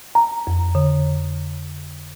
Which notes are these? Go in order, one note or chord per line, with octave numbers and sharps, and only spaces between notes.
A#5
F2
D3